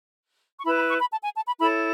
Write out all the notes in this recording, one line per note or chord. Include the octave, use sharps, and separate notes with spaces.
C#6
E4 B4 B5
B5
C#6
B5
A5
G#5
A5
B5
E4 A4 C#5 B5